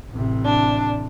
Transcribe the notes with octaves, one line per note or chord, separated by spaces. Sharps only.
A1 C3
D4